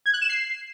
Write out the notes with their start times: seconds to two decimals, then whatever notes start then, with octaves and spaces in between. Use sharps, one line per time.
0.06 G#6
0.14 F#6
0.21 E7
0.29 C7